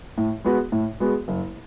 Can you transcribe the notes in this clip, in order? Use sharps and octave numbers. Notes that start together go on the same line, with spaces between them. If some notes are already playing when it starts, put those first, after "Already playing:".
A2
G#3 B3 F#4
A2
G#3 B3 F#4
F#1